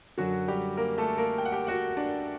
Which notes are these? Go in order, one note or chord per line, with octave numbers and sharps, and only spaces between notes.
F#2 D3 F#3 F#4
G3 G4
A#3 A#4
A3 A4
A#3 A#4
G5
F#5
G4 G5
F#4 F#5
D4 D5